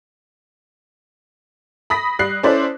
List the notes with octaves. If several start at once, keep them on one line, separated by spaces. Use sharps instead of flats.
B5 D#6 A#6 B6
G3 F#6 C7
C#4 E4 A4 C5 D5